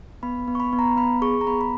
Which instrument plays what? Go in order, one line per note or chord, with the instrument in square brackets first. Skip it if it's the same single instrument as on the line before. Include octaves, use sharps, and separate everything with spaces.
[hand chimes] B3 B5
B3
C#6
B5
B3
A#5
B3 B5
G#4 C#6
A#5
B3 B5
B5